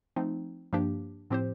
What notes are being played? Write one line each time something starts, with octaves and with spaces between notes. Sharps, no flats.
F3 A3 C4 D#4
G2 F3 A#3 D4 G4
A2 F3 C4 G4 C5